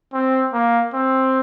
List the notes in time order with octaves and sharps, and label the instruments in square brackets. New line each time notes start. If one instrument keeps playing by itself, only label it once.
[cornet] C4
A#3
C4